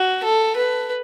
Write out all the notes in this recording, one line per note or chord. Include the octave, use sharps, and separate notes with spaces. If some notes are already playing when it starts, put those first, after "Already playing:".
Already playing: F#4
A4
B4